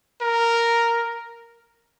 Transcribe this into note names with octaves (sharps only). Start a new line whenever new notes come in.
A#4